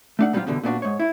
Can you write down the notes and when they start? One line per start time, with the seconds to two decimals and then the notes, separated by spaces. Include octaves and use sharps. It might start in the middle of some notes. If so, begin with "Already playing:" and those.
0.19 A3 D4 F#5
0.33 F#3 G3 B3 C4 F4 G4
0.47 E2 B2 D3 G3
0.63 A#2 B3 D4 F#4
0.82 G#2 C#5
0.99 E4